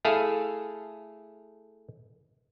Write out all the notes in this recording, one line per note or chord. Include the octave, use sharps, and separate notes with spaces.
A3 E4 G#4 A4 F5